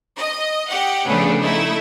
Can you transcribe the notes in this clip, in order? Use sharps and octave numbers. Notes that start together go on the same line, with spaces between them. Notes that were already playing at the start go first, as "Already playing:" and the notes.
D#5
G4 F#5
C#3 F3 A3 B3 C#4 D4
A3 D#4 E4